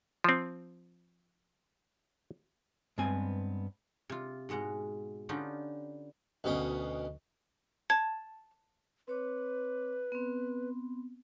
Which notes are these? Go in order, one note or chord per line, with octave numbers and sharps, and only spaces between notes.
F3 C4
G2 G#3 B3 C4 G#5
C3 F4
G#2 B2 G#3 F#5 A#5
D3 C#4 D#4 F4 G4 B4
D2 B2 C#4 G5 D#6
A5 G#6
C4 B4 C#5 D6
B3 C4